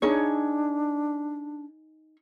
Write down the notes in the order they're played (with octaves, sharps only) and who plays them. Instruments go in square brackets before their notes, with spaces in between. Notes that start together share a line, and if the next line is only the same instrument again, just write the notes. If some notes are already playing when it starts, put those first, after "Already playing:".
[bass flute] D4 [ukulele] D#4 G#4 C#5